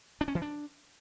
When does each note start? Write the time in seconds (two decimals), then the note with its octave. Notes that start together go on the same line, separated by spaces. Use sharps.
0.21 D4
0.28 C#4
0.35 E3
0.42 D4